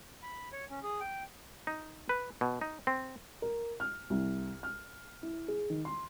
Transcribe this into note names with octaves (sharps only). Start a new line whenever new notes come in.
B5
C#5
C#4
G#4
G5
D#4
B4
B2
D#4
C4
A#4
F6
C2
F6
E4
G#4
D#3
C6